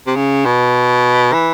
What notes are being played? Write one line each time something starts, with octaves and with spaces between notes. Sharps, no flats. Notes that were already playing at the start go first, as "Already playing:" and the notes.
C3
C#3
B2
E3